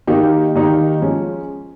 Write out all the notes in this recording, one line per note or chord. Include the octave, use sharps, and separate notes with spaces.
D#3 A#3 D#4 G4
D#3 A#3 D#4 G4
F3 G#3 C#4